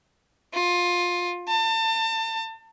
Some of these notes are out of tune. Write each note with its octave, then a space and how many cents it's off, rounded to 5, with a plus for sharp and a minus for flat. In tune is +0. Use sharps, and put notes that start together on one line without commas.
F4 +15
A5 +35